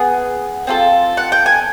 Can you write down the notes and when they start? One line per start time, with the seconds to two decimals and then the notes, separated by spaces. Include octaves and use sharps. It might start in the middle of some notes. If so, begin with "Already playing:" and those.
Already playing: B3 G#4
0.67 C4 F4 A4
1.17 F#5
1.32 G5
1.46 G#5